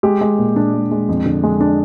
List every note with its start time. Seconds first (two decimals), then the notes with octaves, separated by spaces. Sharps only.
0.03 G#3 G4
0.21 G#3
0.38 A#2
0.56 A#2 D4
0.74 G#3
0.91 G#3
1.09 F2
1.26 D3
1.44 G#3
1.61 D4